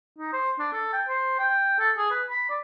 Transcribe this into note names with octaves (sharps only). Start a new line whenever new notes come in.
D#4
C5
D4
A4
G5
C5
G5
A4
G#4
B4
B5
D5